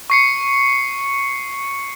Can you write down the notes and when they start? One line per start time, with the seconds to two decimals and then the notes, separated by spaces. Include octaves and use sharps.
0.10 C#6 C7 C#7